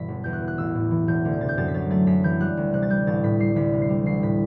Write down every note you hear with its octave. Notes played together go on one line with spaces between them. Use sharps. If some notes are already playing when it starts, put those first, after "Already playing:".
Already playing: G1 G2 B2 E3 B6
E1
E2 G6
F#6
B2
F#6
A1 E6
A2
E3
E1 G6
D2
G6
C3 A6
G6
F#2 A6
B6
F#3 A6
A3 A6
F#2 B6
E3 G6
G3 F#6
D2
C3 F#6
A6
G3 G6
A1 A6
A2 B6
G3 C7
D2 B6
C3
C7
G3
A1 C7
A2 B6